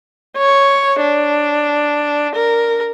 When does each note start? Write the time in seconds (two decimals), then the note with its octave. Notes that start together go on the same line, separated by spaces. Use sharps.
0.37 C#5
1.00 D4
2.35 A#4